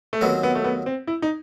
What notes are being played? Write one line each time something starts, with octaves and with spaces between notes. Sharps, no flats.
A3
D#2 D#3 F#3 B3 C4
B3
A3
B3
C4
E4
D#4